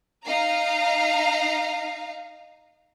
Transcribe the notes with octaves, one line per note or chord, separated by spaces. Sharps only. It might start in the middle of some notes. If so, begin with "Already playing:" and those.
D#4 F5 A#5